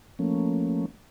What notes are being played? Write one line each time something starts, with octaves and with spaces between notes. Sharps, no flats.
F3 A3 A#3 C#4